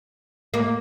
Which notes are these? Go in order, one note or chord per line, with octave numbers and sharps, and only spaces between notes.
A#3